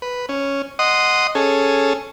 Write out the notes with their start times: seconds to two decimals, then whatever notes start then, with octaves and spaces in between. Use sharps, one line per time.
0.02 B4
0.29 C#4
0.79 D#5 F#5 C6 D#6
1.35 C#4 G#4 A4